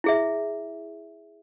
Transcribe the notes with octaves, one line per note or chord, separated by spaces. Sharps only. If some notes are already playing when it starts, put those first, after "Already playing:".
E4 G#4 E5